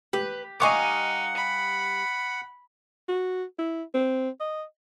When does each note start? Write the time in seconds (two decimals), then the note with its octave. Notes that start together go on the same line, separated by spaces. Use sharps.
0.13 G4 B4
0.60 G3 D#4 D#5 F5 F#5 G#5 C#6 D6
1.36 B5
3.08 F#4
3.59 E4
3.95 C4
4.40 D#5